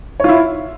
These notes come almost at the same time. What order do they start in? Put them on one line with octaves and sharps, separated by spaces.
C#5 F4 E4